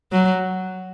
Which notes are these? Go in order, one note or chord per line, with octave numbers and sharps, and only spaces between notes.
F#3